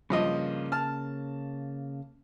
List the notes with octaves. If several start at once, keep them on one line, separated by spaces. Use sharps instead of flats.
G2 C#3 F3 A#3 D#5
A5 F6